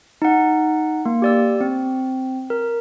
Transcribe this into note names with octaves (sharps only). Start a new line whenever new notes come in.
D#4 F#5
A#3
G4 D5 E6
C4
A#4